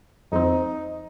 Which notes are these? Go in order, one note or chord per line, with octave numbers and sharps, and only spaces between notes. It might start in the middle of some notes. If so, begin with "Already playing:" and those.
F2 F3 C4 D#4